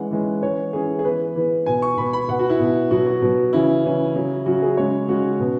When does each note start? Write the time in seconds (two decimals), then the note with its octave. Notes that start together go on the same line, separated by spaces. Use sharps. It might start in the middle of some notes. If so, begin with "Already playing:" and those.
Already playing: E3 G#3 C#4 F#5
0.11 E3 G#3 C#4
0.42 E3 C#4 C#5
0.73 E3 C#4 G#4
0.99 G#4
1.05 E3 B3 B4
1.36 E3 B3
1.66 B2 B3 G#5
1.82 C#6
1.97 B2 B3 B5
2.13 B5
2.28 B2 B3 F#5
2.39 F#4
2.50 E4
2.60 B2 B3
2.91 B2 F#3 B3 F#4
3.07 F#4
3.22 B2 F#3 B3
3.53 C#3 E3 C#4 E4
3.84 C#3 E3 C#4
4.15 C#3 F#3 C#4
4.46 C#3 F#3 C#4 F#4
4.62 G#4
4.77 C#3 G#3 C#4 C#5
5.08 C#3 G#3 C#4 F#4
5.40 B2 B3